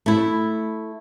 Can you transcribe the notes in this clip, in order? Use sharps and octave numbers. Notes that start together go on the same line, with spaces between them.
A3 E4